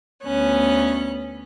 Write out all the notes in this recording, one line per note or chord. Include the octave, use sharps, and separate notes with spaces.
D2 B3 C#4 F#6